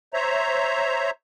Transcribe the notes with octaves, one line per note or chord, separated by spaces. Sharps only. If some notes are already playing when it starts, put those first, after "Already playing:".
C5 C#5 E5 A#5